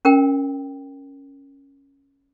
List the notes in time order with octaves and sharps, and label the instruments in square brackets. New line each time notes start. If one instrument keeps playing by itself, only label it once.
[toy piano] C#4 A#4 G5